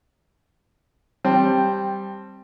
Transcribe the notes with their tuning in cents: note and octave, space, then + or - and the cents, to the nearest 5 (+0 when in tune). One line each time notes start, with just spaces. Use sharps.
G3 +0 C4 +5 A5 +0